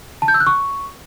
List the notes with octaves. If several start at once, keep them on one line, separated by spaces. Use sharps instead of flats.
A5
G6
E6
F#6
C#6